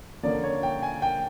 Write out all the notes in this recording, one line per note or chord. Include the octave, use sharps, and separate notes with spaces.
D3 F3 A#3 C#4 D5
C#5
G5
G#5
G5